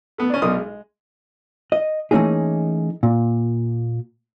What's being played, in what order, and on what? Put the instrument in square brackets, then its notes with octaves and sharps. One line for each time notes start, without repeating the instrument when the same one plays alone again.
[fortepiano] A3 B3
C#4 D4
B1 B2 D4 A#4 C6 D#6
G#3
[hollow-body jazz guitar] D#5
E3 A3 A#3 C#4 D#4 G#4
A#2